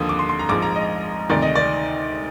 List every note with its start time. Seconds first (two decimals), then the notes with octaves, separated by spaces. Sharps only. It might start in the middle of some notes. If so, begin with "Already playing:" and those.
Already playing: D#2 D3 F3 D#6
0.09 D6
0.19 C6
0.29 C6
0.39 A#5
0.49 A#1 G#2 F3 D6
0.62 A#5
0.76 D#5
1.30 D2 C3 D#3 D5
1.42 D#5
1.55 D5